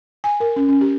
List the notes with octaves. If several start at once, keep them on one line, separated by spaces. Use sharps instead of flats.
G#5
A#4
C#4
C#4
G4